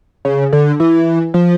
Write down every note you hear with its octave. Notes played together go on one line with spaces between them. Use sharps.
C#3
D3
E3
F3